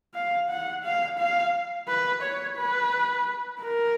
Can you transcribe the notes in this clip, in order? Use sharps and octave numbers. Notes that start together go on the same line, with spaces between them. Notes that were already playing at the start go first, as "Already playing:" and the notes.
F5
F#5
F5
F5
B4
C#5
B4
A#4